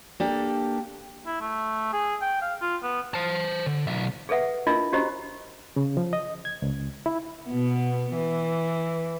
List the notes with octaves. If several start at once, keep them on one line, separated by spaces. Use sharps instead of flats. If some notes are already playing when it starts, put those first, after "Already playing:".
A#3 D4 G4 A4
E4
A3
G#4
G5
F5
F4
B3
C5 A5
D3
B1 E5
G#4 A4 B4 E5 F#5
D4 E4 F4 A#4 D#5
C#4 F#4 G4 C5 D#5 A#5
C#3
F3
D#5
G#6
C#2
E4
B2 B3
E3